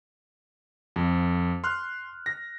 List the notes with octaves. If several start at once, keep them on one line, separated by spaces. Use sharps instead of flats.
F2
C6 F6 F#6
A#6